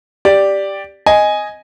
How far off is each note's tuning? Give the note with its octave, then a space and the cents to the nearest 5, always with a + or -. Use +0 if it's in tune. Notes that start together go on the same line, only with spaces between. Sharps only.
G4 +0 D5 +0
D#5 +0 G#5 +0